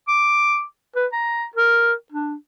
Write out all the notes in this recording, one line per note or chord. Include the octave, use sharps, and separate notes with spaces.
D6
B4
A#5
A#4
D4